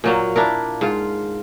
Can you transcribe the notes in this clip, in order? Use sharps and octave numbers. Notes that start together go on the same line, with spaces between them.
A#2 F#3 A#3
D4 E4 A#4
G#2 F4